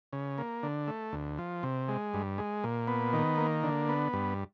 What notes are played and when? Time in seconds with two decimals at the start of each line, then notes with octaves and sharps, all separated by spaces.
0.13 C#3
0.38 A#3
0.63 D3
0.88 A3
1.13 D2
1.38 F3
1.63 C3
1.88 G#3
2.14 G2
2.38 G#3
2.64 A#2
2.88 B3
3.13 D#3
3.38 A#3
3.63 D3
3.89 B3
4.13 G2